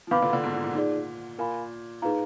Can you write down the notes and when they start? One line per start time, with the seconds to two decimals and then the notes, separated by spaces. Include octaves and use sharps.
0.07 F3
0.11 B2 D#3 B4 F5 B5 D6
0.22 A#2 D3
0.33 A#2 D3
0.43 G#2 B2
0.54 A#2
0.64 A#2
0.75 D#4 G#4 D5
1.39 A#2 A#4 F5 G#5 B5
2.02 A#2 D#4 G#4 B4 F5 A#5